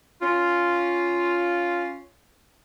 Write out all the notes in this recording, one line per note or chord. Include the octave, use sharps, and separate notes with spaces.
C#4 F4